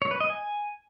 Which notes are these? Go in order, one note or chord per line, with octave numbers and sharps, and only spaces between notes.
C#5
B4
D#5
G#5